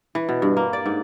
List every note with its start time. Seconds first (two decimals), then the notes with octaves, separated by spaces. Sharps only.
0.15 E3
0.29 B2
0.42 G2
0.57 A#3
0.73 D5
0.86 G#2